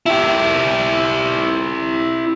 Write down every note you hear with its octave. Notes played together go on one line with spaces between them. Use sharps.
E4 G4